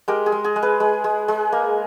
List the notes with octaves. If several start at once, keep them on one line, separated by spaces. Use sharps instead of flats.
G#3 G4 A#4
G#4
G#3
G#4
G#3
G#4 B4
G#3
G#3
G#3
A#3